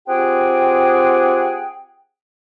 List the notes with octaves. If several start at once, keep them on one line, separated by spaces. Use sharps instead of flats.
C4 F4 G4 G#4 F#5 G5